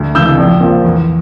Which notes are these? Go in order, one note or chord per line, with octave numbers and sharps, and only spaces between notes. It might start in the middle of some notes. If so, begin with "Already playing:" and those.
Already playing: D2
C#3 E3 E6 G6
A#1
A#2 F3
E2